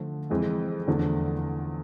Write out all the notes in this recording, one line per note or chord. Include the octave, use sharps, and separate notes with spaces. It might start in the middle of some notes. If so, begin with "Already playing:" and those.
Already playing: D3 F3 A3
F2 E3 G#3
E2 D3 F3 A3 D4